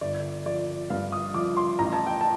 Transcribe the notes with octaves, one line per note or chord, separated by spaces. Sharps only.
G1 D5
F3 D5
G2 F5
D#6
F3 D6
C6
A1 A#5
A5
G5
A5